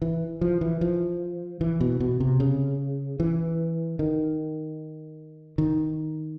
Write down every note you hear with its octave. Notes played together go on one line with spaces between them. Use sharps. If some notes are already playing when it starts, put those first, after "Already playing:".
E3
F3
E3
F3
E3
B2
B2
C3
C#3
E3
D#3
D#3